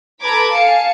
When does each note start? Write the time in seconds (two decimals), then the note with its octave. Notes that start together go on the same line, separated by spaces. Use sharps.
0.20 A4 B4 A#5 B5 D6 G#6
0.54 F5 G#5 A5 C#7